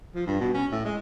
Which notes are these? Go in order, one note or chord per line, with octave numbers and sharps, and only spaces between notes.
F3
G2
B2
C#4
A2
G#3